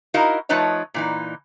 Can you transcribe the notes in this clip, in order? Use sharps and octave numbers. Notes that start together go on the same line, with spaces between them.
D#4 E4 F#4 A#4 D#5 F5
F3 A3 D#4 B4 C#5 D#5
A#2 E3 D#4